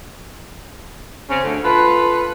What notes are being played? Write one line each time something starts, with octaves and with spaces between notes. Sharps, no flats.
C#3 C4 C#4
D2
F4 A4 B4